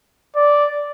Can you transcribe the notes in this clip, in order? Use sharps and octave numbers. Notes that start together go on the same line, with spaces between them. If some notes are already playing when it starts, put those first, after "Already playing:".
D5